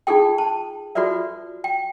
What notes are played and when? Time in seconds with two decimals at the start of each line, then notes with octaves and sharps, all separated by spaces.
0.07 D#4 F4 G#4 A4 G5
0.38 A5
0.95 F4 F#4 A4 B4 D5 E5
1.64 G5